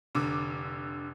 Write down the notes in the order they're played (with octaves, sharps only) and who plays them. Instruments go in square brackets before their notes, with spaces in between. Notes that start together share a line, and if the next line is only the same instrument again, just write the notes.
[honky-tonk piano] F1 D3 D6